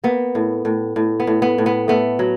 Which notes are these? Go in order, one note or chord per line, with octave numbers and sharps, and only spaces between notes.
A#3 B3
A2
A2
A2
B3
A2
B3
A2
B3
A3 B3
F#3